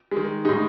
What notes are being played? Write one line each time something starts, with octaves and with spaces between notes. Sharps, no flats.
G#3
D#3
A2 G#3 D#4